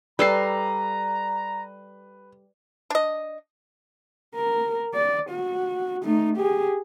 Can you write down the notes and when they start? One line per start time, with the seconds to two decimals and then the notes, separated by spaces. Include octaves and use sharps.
0.19 G3 A4 B4 A#5 C7
2.90 D4 D#5
4.35 A#4
4.94 D5
5.30 F#4
6.03 A3 D#4
6.37 G4 G#4